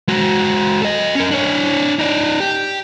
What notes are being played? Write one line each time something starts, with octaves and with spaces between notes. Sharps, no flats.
G#3 F#4
A4 D#5
C#4 A#4
D4 C#5
D#4 D5
G4